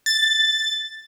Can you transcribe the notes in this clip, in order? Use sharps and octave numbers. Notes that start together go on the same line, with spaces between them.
A6